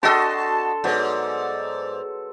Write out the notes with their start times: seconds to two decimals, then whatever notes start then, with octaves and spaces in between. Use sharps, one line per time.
0.03 D4 F#4 A4 D#5 A5 C6
0.84 G#2 F#3 B3 C#5 D5